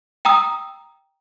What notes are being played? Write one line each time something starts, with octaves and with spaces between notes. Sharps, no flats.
G5 A#5 D#6 E6